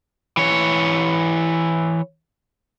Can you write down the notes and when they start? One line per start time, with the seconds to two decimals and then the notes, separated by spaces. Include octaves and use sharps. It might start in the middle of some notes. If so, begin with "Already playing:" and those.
0.37 E3 C#5